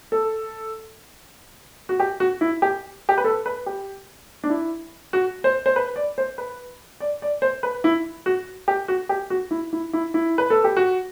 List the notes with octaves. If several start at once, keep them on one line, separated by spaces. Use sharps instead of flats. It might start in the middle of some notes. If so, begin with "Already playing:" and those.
A4
F#4
G4
F#4
E4
G4
G4
B4
A4
B4
G4
D4
E4
F#4
C5
C5
B4
D5
C5
B4
D5
D5
C5
B4
E4
F#4
G4
F#4
G4
F#4
E4
E4
E4
E4
B4
A4
G4
F#4